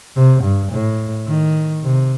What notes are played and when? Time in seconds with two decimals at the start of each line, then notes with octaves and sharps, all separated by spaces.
0.16 C3
0.43 G2
0.73 A2
1.28 D#3
1.84 C3